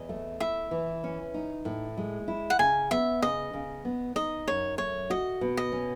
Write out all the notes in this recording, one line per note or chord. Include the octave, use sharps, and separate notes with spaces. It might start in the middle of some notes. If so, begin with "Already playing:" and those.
Already playing: E2 D#5
A3
E4 E5
E3
C#4
D#4
A2
G#3
E4
F#5
C#3 G#5
B3 E5
C#3 D#5
C#3
B3
D#4 D#5
F#2 C#5
A3 C#5
F#4 D#5
B2
D#5
C#4